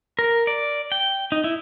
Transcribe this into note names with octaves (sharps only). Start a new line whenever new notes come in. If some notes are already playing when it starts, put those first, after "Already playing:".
A#4
D5
G5
D#4
E4